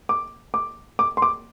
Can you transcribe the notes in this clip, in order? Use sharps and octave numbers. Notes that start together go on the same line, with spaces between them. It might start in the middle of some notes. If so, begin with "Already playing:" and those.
D6
D6
D6
C6
D6